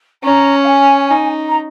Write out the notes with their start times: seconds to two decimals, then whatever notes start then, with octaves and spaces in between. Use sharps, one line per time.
0.23 C#4 A#5
0.62 F5
0.67 G#5
1.11 D#4
1.48 A#5